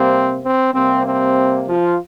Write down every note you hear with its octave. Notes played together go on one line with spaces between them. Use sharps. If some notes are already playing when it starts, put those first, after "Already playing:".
Already playing: C3 G3 A#3 C4
C4
C3 G3 A#3 C4
C4
F3 F4